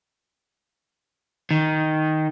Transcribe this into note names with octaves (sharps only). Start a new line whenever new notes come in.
D#3